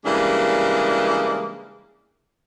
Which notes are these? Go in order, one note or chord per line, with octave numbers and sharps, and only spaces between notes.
C#3 E3 G3 G#3 A#3 D4